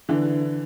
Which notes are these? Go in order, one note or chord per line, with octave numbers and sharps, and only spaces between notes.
D3 E3